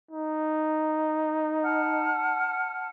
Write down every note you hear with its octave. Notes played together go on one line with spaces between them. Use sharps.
D#4
F#5 A5 F6